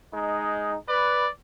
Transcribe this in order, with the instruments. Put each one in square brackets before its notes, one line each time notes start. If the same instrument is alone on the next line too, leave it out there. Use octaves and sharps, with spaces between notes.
[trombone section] G#3 D#4
[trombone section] B4 [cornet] D5